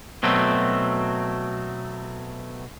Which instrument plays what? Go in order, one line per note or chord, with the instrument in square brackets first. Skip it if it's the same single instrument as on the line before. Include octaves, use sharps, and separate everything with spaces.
[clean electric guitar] B2 F#3 A3 C4